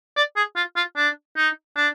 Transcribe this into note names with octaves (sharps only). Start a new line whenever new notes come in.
D5
G#4
F4
F4
D4
D#4
D4